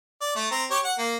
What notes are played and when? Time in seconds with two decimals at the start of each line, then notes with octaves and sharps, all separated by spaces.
0.21 D5
0.36 A3
0.51 C4 A#5
0.71 G4 C#5
0.84 F#5
0.98 A#3